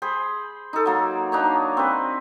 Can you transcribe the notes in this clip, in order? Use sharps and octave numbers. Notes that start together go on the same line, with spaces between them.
G#4 C5 B5
D#4 A4
F#3 A#3
D4 D#4 C#5
C4 B4